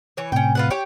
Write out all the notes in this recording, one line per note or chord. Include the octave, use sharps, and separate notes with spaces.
E3 C#5
A2 C3 C#4 G5
F4 B4 F#5
G4 C#5